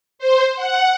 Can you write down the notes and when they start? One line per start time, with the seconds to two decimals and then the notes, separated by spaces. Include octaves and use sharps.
0.19 C5
0.56 F#5